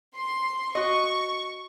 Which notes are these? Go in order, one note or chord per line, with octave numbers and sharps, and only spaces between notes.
C6
F#4 D#5 C#6